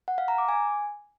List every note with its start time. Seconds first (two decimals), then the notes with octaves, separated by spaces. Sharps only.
0.08 F#5
0.18 F5
0.28 A#5
0.38 D6
0.48 G#5